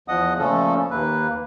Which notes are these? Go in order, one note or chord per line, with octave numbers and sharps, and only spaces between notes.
E2 F3 D#5 F#5 D#6
A#2 C#3 F3 A3 C#4 A4
D#2 A#3 B4